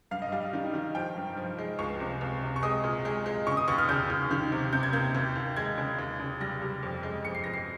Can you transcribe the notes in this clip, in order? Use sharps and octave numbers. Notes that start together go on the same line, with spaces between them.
G2 F5
D#5
G3 F5
D#3
D#3
F3 G5
G2
F3
G#3
C#2 C#6
C3
C#2
C3
C#6
G#3 D#6
A#2
G#3
G#3
C#3 C#6
D#6
D#2 C#6
F6
C#3 G6
D#2
D#3
C3
C3 G6
G#6
A#3 G6
D#2
D#2
G#3 G#6
C#3
D#2
C#3
G3 A#6
G3
F2
G#3
F2 C#7
C7
F2 A#6
C7